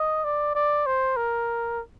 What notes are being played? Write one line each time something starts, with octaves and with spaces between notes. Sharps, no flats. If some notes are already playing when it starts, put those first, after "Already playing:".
Already playing: D#5
D5
D5
C5
A#4